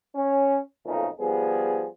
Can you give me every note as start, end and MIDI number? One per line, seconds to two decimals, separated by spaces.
0.16 0.60 61
0.86 1.07 35
0.86 1.07 41
0.86 1.07 46
0.86 1.07 49
0.86 1.07 57
0.86 1.07 63
1.20 1.87 53
1.20 1.87 55
1.20 1.87 59
1.20 1.87 68